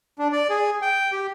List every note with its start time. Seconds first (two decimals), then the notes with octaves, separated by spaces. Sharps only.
0.19 D4
0.33 D5
0.50 G#4
0.82 G5
1.12 G4